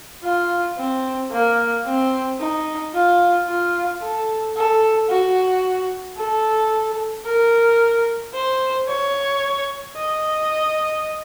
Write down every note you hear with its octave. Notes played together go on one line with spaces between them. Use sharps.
F4
C4
A#3
C4
D#4
F4
F4
A4
A4
F#4
A4
A#4
C5
C#5
D#5